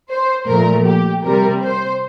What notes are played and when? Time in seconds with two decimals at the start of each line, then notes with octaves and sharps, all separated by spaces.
0.10 C5
0.47 A#2 F3 A3 A#4
0.85 G4
1.23 C3 G3 A#4
1.61 C5